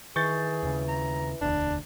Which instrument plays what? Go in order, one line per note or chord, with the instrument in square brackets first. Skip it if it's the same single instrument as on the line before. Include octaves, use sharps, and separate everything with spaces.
[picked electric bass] D#3 [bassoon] E3 [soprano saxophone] G#4 [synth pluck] C#6 G6 A6
[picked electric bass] D#2 C#3
[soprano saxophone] A#5
[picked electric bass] E1 D2 [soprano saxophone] D4